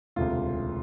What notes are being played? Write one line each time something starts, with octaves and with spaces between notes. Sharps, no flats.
E1 D2 C3 F4